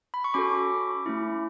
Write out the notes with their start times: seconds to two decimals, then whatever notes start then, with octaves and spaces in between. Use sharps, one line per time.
0.14 B5
0.24 C#6
0.34 C#4 F#4 A4 B5 D6
1.06 A3 C#4 E4